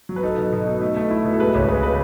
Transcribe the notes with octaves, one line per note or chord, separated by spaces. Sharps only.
F#3
B4
D#4 A4
B2
B2
D#4
A3
A3
E4
B2
A4
G#3 B4
C#2 C#5
C#3 B4
B4